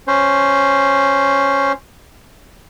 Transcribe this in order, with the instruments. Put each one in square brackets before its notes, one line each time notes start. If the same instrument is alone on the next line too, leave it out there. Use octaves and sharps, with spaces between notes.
[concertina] C#4 C5